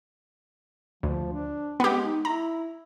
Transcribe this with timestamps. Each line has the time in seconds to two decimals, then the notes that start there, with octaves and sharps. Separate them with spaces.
1.03 D2 F3
1.33 D4
1.80 G#3 B3 G4
2.04 D#4
2.25 E4 A#5